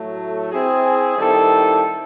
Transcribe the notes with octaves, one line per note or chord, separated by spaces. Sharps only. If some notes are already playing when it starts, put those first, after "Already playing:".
Already playing: A2 F#3 A3
C4 E4 G#4
D#3 G3 C4 E4 A4